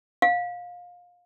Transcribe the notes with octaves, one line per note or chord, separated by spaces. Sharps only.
F5